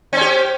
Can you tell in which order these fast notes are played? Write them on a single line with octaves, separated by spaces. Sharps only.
C4 C#4 G4